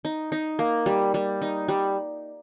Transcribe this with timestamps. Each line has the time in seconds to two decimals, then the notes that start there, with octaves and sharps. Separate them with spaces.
0.05 D#4
0.32 D#4
0.59 A#3
0.86 G3
1.14 G3
1.42 D#4
1.68 G3